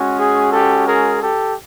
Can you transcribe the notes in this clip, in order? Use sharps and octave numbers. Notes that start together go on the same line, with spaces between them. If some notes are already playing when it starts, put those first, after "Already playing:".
Already playing: G#3 C#4 F#4
G#4
G4 A4
G#4 A#4
G4 A4